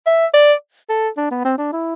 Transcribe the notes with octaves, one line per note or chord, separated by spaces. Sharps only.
E5
D5
A4
D4
B3
C4
D4
E4